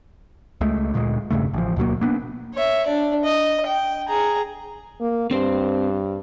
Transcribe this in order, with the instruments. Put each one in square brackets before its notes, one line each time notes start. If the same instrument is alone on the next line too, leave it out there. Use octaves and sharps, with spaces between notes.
[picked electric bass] C#2 G#3 A3
D2 A#2 G3 G#3
E1 G2 C#3 A3
A1 F3
D2 B2 F#3 A#3
A#3 B3 D4
[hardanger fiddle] C#5 E5
D4 D5
D#5
G5
G#4 A#5
[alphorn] A#3
[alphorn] G2 [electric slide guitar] C4 C5